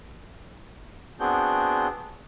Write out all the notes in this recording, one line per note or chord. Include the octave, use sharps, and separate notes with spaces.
B3 C4 D4 F#4 G#4 G6